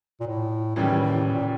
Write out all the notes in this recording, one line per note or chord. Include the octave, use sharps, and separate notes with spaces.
A#2
A2
D#2 A2 C#3 E3 G3
A2
A2
A#2